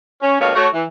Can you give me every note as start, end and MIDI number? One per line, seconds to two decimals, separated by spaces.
0.22 0.37 61
0.40 0.52 43
0.40 0.52 47
0.40 0.52 57
0.40 0.52 58
0.40 0.52 73
0.40 0.52 77
0.55 0.68 57
0.55 0.68 66
0.55 0.68 73
0.74 0.85 52